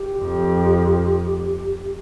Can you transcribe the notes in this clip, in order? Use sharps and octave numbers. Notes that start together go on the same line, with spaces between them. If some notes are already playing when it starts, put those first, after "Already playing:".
Already playing: G4
F2